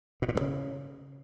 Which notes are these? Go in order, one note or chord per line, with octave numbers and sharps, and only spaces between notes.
B2
A#2
G2
C#3